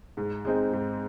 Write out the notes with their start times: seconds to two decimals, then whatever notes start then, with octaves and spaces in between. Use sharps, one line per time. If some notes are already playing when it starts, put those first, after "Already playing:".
0.17 G#2
0.45 G#3 C4 D#4
0.73 G#2